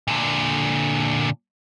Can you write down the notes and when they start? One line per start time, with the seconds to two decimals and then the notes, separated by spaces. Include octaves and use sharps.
0.08 A#2 D3